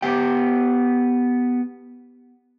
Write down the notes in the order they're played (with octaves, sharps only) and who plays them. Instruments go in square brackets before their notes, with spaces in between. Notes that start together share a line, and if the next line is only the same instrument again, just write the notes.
[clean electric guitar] B3 G4 G5